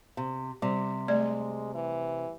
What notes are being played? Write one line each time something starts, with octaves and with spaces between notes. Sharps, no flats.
C3
C3 G3
G#3 A3 D5
E3